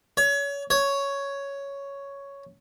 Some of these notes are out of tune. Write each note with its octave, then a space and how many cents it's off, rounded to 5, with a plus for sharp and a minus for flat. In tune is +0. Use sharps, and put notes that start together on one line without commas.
C#5 +30
C#5 +5